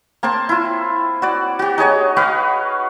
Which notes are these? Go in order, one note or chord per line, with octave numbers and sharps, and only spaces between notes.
A#3 C4 C5 A5
E4 F4
F#4 D5
F#4 G4
D#4 G#4 C#5 D#5
F#4 B4 D#5 F5